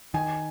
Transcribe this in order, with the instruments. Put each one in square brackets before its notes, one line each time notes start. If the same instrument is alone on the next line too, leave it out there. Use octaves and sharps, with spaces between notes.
[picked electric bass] D#3 [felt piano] G#5